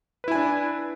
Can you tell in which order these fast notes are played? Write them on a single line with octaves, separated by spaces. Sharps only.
B4 E4 G#5 D4